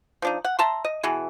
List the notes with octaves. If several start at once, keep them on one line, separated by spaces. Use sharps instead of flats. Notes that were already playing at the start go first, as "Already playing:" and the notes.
F3 D4 D#4
F#5
E5 A5 A#5 C6
D#5
B2 E3 G#4